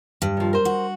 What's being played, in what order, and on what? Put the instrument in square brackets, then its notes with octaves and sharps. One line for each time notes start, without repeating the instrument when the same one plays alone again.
[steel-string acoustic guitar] G2
[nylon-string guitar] D#3 F3
A#4 C5
[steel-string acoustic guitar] F#4